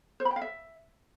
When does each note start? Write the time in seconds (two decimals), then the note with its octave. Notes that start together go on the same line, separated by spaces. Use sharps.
0.20 C5
0.25 B5
0.31 G5
0.36 F5
0.42 E5